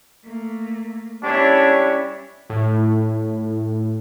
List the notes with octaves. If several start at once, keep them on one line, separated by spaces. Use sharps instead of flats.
A3 A#3
G3 C#4 D4 E4 C#5
A2